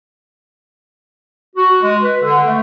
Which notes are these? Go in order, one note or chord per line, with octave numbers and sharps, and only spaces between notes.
F#4
G#3
B4
D3
A3